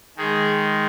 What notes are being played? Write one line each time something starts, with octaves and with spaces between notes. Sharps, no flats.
D#3 G#3 G#4